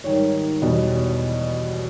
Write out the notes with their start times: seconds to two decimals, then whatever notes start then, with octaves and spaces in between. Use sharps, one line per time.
0.04 G#2 D#3 G3 C#5
0.62 E2 B2 G3